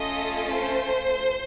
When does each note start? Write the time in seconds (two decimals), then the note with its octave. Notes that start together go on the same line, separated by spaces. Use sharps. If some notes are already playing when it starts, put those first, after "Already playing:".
Already playing: A3 C#4 F4 A4 D#5
0.50 C5